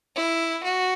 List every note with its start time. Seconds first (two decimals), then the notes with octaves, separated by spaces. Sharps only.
0.15 E4
0.63 F#4